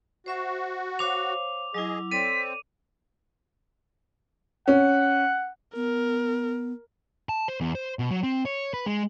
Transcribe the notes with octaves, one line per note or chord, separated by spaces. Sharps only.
F#4 C5 E5 C#6
C5 C#5 F5 D6 F7
F#3 E4 G#4 D#5
C4 A4 C#5 D5 B6 D#7
C#4 F#5
B3 A#4
A5
C5
E2
C5
B2
F#3
C4
C#5
B4
G#3